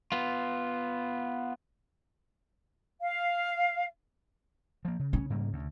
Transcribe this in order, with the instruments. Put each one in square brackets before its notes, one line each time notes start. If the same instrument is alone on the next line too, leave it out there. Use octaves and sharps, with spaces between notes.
[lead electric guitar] B3 F4
[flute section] F5
[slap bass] F3 A#3
C#3
[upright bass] C#3 [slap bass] C#4
[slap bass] G#2 G3 A#3
D2